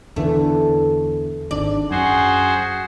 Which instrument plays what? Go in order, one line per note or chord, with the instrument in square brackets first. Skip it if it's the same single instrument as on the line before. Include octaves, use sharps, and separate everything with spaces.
[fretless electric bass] E2 D3 E3 [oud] A3
[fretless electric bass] G#1 G#2 D4 [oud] D5
[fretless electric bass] F#2 [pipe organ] F#4 G#4 C5